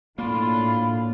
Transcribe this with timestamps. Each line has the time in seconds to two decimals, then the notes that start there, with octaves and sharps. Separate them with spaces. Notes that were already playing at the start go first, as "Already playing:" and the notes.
0.18 A2 A#3 D4 F4 B5